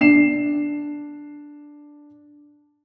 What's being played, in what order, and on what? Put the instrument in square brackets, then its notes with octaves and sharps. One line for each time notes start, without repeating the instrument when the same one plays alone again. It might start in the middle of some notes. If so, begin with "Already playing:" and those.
[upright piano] D4 C7 E7